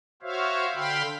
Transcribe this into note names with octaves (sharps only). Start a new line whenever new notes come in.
F#4 C5 C#5 E5 F5
D3 F5 G5 B5 C6